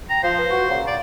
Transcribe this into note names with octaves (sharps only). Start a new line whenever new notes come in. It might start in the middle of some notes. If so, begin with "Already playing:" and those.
G5 A#5
F3 C5 F5
B4
F#4
A#2 C#3 F5
D5